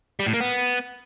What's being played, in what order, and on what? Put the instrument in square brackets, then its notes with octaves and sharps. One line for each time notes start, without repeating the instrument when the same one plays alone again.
[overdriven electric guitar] G3
A2
A#3
B3